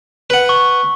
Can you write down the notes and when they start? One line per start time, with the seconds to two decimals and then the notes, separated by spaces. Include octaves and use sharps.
0.30 B4 F#5
0.49 C#6